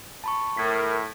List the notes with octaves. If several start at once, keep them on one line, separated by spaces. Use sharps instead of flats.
A5 B5 C#6
A2 A#4 B6